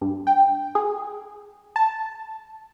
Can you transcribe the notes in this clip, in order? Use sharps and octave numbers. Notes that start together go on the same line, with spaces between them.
G2
G5
G#4
A5